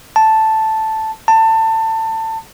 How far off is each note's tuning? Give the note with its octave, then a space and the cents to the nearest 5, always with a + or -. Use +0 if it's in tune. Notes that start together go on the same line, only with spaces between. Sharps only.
A5 +0
A5 +25